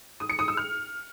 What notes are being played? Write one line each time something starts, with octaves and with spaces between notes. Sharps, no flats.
D#6
C#7
D#6
E6
F6